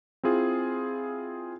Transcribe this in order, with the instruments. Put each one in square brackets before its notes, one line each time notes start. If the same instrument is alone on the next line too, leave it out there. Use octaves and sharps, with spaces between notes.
[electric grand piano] C4 E4 F4 G#4